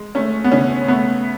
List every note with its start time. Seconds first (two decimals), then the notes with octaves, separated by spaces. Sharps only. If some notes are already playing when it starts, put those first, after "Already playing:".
Already playing: G#3
0.15 A3 C#4
0.44 B3
0.52 C#3 C#4
0.88 A3 B3